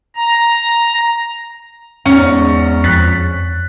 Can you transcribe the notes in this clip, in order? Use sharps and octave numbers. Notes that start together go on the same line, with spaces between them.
A#5
E2 G#2 C#4
F2 F#6 A6 B6